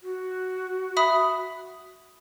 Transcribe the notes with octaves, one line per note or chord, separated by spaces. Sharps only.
F#4
E5 B5 D#6